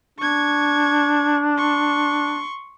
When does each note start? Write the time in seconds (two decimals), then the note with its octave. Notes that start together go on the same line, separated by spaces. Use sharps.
0.19 D4 C#6 G#6
1.58 C6 C#6